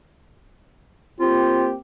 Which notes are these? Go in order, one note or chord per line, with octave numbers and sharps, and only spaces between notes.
A#3 C4 F4 G4